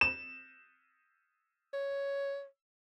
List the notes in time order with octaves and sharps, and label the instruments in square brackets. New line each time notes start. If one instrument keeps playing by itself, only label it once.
[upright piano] E7
[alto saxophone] C#5